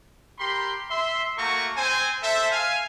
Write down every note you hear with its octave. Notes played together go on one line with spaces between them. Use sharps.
G4 A#4 B5 C6
E5 C6
A3 A#3 F#4 A#5 C#6
C4 C5 G#5
A4 C5 E5
F5 G#5